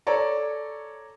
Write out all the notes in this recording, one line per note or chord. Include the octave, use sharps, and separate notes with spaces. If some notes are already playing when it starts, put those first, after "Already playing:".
A4 C#5 D5 A#5